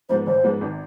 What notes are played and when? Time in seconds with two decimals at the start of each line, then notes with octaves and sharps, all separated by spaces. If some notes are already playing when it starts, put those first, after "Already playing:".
0.09 G#2 F3 G#3 B3 C5
0.27 A1 C5
0.44 G#2 F3 G#3 B3
0.61 G#1